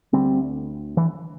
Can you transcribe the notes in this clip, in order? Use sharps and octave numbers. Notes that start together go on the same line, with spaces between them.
D2 D3 G3 C4
E3